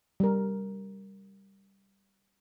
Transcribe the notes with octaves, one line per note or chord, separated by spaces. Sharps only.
G3 A#4